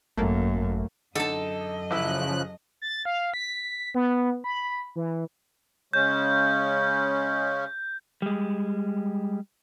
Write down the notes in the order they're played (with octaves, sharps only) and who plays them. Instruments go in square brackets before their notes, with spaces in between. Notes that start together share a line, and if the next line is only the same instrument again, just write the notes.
[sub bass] G#1 [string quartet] F#2 [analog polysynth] A3 A#3
[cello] F#2 D#5 [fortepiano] D3 D#4 [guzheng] A4 A5
[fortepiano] A1 E4 [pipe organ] C#3 F3 F#6
[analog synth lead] A6
F5
B6
B3
B5
E3
[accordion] C#3 G#3 C#4 [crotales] G6
[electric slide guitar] G3 G#3